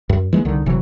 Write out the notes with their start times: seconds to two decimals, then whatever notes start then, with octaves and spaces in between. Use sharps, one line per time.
0.09 F#2
0.33 E3 G#3 A#3
0.45 C2 D3 D#3
0.66 F#1 C3 E3 F#3